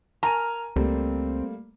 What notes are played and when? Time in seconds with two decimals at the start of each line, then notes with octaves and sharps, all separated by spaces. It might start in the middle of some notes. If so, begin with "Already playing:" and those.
0.23 A#4 G#5 A#5 F6 D#7
0.76 C#2 G3 A3 A#3 C4